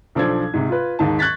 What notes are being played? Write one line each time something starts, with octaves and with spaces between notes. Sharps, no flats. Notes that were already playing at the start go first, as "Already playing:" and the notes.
B1 F3 D4 A4 C5 G#6
G#2 C3
F4 B4
D#2 G#2 A5
C#6 F#6 G#6 A6 B6